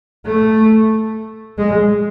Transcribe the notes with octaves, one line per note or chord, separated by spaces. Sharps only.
A3
G#3